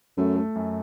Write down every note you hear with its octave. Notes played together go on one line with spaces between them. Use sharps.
F#2 A3
A3
F#2